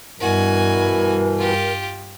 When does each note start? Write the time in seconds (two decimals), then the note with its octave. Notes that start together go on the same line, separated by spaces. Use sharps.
0.20 G2 B2 E3 F#4 A#4 G#5
1.37 F4 G4